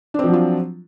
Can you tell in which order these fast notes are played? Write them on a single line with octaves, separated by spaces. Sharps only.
D4 C4 F3 F#3 F4